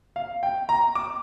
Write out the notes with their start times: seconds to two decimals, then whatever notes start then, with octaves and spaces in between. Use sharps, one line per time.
0.16 F5
0.43 G5
0.69 A#5
0.95 D6